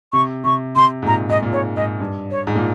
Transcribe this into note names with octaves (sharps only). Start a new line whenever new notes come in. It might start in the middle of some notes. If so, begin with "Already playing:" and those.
C3 C#6
C3 C#6
C3 C6
G#2
A#2 A#5
G#2 D#5
A#2
G#2 C#5
G#2 D#5
G2
C#5
G#2
A#2